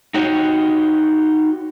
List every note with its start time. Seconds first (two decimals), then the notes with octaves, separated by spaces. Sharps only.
0.14 D#4 F#4 G4 C#5